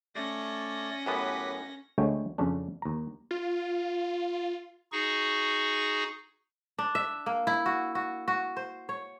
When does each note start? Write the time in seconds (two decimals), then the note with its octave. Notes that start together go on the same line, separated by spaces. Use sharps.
0.15 A3 C#4 D5 A#6
1.06 F#2 A2 B3 G4 B4
1.98 D2 D3 G#3 A3 C#5 G5
2.38 F2 C#3 C#4 D4
2.82 D#2 A#5
3.31 F4
4.92 D#4 F#4 G#4 C#6
6.78 D4
6.95 E5
7.26 A#3
7.47 E4
7.66 F#4
7.95 F#4
8.28 F#4
8.57 C5
8.89 C#5